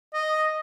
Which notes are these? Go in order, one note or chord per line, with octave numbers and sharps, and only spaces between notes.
D#5